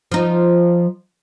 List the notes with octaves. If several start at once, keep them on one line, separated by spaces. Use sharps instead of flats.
F3 D#4